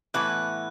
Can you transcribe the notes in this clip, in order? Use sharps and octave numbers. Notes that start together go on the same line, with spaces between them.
A2 E3 B3 E4 B4 F#6